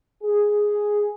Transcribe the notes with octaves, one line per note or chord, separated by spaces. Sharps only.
G#4